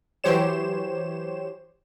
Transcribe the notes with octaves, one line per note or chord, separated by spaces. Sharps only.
E3 F#3 G4 C5 C#5 E7